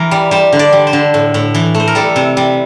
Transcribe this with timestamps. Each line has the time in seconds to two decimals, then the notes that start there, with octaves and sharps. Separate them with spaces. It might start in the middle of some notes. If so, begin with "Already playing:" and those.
Already playing: E3 A#4
0.11 G3
0.31 G3 C5
0.53 D3
0.59 D5
0.72 G3
0.87 C5
0.93 D3
1.14 A2
1.34 A2
1.55 E3
1.75 A3
1.80 C5
1.88 A#4
1.95 G3 A4
2.16 C3
2.37 G3